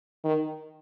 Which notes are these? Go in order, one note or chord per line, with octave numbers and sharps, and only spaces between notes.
D#3